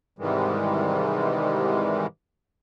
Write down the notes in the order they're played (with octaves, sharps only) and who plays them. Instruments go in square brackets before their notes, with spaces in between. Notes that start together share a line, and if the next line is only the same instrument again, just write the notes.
[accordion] G#2 C3 D#3 E3 G3 G#3